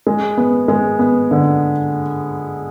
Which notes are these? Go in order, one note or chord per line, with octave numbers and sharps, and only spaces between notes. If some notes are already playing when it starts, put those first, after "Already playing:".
G#3
B3
G#3
B3
D3